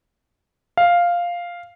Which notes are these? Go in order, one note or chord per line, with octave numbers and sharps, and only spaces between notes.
F5